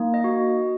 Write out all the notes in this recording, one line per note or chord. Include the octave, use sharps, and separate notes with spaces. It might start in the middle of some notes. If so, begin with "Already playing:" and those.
Already playing: A#3 D#4
D#5
F#4